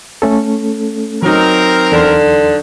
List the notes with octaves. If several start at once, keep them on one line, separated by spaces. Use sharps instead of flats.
A3 C#4 A4
F#3 C4 D#4 A#4
E2 D3 C6